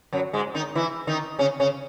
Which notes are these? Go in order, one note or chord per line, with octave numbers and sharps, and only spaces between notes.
F#2 F#3
G#2 G#3
D#3 D#4
E3 E4
D#3 D#4
C#3 C#4
C#3 C#4